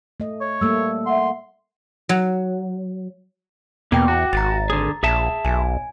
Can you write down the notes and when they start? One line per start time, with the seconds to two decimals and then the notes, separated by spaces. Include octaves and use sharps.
0.20 A3 D#5
0.41 C#5
0.61 G3 A3 A#3 E6
1.06 E5 F#5 C6
2.09 F#3
3.92 E2 B2 A#3 G5 D6
4.08 F#4
4.33 G#1 A#5 A6
4.70 D3 G#4
5.03 A#1 G#4 E5 A5
5.45 B1 G#5